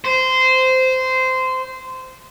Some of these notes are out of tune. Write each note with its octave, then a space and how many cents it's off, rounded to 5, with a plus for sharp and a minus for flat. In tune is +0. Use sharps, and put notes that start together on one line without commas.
C5 -15